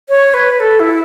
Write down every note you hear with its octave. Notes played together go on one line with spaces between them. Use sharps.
C#5
B4
A4
E4